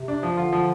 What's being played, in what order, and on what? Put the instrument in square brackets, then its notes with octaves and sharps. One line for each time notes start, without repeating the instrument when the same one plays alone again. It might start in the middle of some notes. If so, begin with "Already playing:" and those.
Already playing: [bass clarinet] C3
[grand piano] D4
F3
[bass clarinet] D3 [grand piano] F4
[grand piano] F3